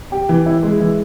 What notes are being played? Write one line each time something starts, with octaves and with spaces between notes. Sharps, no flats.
G4
E3
E4
G#3
E3